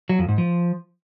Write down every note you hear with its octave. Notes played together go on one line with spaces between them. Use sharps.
F#3
F2
G#2
F3